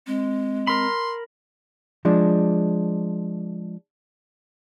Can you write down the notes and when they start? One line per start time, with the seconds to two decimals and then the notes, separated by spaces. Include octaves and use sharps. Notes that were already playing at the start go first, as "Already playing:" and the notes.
0.07 G#3 C4
0.67 A#4 B5 C6
2.05 F3 G#3 D4